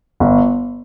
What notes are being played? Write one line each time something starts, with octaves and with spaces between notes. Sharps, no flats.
G1